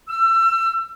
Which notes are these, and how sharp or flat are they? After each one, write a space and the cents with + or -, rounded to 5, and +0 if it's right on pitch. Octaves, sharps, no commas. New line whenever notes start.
E6 +30